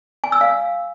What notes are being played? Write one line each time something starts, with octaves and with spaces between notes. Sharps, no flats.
G#5
E6
F5